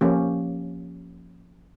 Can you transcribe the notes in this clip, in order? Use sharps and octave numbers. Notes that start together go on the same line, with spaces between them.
F3 A#3 C#4 G4